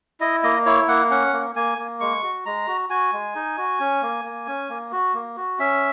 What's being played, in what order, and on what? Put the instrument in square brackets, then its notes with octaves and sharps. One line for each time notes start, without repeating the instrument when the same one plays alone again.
[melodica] E4 D#5
A#3 D#5
E4 C#5
A#3 F#5
C#4 F#5
A#3
A#3 G#5
A#3
G#3 C#6
F#4
G#3 A#5
F#4
F#4 G#5
G#3
D#4
F#4
C#4
A#3
A#3
C#4
A#3
F#4
A#3
F#4
C#4 E5